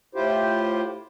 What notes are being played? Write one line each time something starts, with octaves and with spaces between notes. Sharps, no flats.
A2 E4 F4 G4 C5